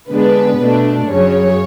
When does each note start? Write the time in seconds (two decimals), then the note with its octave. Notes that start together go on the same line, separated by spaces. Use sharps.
0.11 D3 G#3 B3 D4 B4
0.59 B2 A3 D4
1.09 F#2 C#3 F#3 C#5